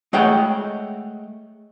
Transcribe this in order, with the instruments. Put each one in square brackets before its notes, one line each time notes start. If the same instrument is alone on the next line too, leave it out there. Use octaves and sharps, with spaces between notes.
[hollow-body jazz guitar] G#3 A3 C#5 F#5 G5